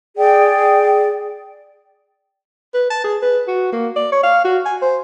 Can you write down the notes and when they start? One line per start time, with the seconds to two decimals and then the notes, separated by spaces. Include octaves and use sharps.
0.17 G#4 D5 G5
2.74 B4
2.90 A5
3.04 G#4
3.22 B4
3.48 F#4
3.73 A#3
3.96 D5
4.12 C#5
4.23 F5
4.44 F#4
4.66 G#5
4.82 C5